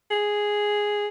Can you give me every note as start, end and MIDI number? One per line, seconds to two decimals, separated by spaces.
0.10 1.07 68